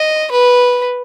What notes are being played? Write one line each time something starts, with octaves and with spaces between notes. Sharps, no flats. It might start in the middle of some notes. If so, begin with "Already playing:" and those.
Already playing: D#5
B4